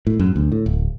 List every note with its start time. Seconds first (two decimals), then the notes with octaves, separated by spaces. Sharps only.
0.07 A2
0.19 F#2
0.36 D2
0.52 A2
0.66 D1